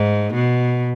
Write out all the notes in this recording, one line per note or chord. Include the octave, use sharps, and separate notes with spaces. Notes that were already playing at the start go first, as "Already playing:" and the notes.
Already playing: G#2
B2